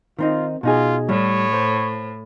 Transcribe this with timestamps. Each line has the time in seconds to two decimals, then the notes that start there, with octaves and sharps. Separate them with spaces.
0.19 D#3 C4 D#4 F4
0.63 B2 D#4 F4 G#4
1.09 A2 G3 C#5
1.53 C5